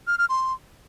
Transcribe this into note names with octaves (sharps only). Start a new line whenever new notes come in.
F6
F6
C6